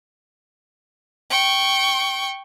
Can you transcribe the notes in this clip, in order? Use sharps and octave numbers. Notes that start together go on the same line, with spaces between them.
G5 C#6